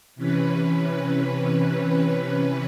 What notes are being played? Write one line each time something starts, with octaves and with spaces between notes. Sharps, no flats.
C3 E3 C#4 B4